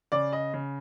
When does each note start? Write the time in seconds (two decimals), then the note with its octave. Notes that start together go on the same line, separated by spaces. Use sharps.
0.12 C#3 D5
0.32 D#5
0.54 C#3